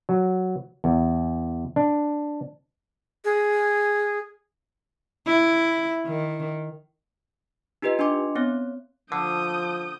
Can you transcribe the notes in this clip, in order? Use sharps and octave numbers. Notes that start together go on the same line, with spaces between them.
F#3
E2
D4
G#4
E4
D#3
D#4 F4 G4 B4 D#5
D4 D#5 G#5 C6 D6
B3 C4 C#5
D3 F3 D#6 G6